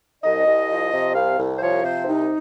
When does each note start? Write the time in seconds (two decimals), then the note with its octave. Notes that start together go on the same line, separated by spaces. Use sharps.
0.23 C2 D#5
0.45 C2
0.68 F3
0.92 C3
1.15 C2 F5
1.38 C2
1.56 C5
1.61 F3 C#5
1.83 C3 C5
2.06 C2 D#4